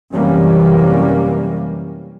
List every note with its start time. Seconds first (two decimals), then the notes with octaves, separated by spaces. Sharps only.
0.13 F#2 C3 E3 G3 A#3 C#4